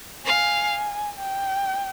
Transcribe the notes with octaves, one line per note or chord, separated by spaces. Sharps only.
F5 G#5
G5